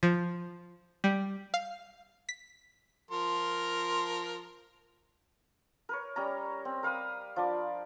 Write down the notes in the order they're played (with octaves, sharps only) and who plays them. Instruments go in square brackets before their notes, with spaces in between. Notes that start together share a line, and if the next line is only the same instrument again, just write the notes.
[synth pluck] F3
G3
F5
B6
[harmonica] F3 A#4 C6
[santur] A#4 B4 C#5
G3 C#4 A#5
C4
A#4 F5 B5 D#6
F3 D4 D5